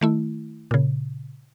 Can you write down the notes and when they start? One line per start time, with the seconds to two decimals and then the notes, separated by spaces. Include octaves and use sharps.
0.01 D#3 A3 E4
0.71 A#2 C#3